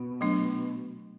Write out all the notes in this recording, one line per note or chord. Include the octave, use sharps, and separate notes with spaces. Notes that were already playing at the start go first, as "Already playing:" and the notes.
Already playing: B2
F#3 A3 D4